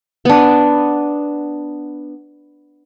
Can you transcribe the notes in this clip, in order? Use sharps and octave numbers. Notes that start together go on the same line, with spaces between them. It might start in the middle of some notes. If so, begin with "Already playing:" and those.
B3 D4